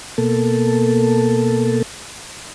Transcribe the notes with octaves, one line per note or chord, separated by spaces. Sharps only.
B2 A#3 A4